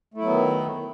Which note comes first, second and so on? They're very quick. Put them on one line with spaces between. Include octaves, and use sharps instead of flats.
A3 E4 F#3 B3 D#3